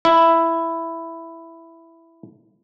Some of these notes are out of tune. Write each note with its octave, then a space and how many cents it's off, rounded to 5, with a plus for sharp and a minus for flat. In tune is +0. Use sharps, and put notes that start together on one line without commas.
E4 +5